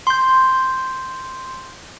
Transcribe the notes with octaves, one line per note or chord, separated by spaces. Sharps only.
C6 G6